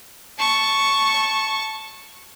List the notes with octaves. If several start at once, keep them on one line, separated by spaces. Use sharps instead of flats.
A5 C#6